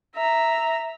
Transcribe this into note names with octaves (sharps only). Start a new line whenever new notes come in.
E5 A#5